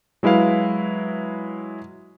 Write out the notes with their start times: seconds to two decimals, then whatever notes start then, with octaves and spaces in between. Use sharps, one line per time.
0.23 F#3 G#3 E4 B4 F5